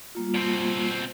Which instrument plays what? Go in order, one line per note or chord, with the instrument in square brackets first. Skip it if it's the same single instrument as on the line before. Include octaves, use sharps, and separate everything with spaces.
[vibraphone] G3 A#3 F4
[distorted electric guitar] B2 C4